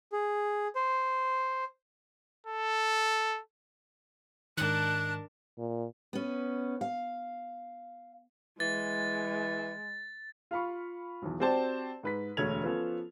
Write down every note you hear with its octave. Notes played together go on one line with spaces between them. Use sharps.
G#4
C5
A4
G#2 D#3 D4 A#4 A5 F#6
A#2
B3 C#4
F5
E3 G#3 A6
F4 F5 B5 C#6
B1 E2
C4 F#4 G4 C5 D5 A5
G#2 B4 B6
E1 D2 A3 C#5 G#6 F7
F3 B3 C#4 F4 A4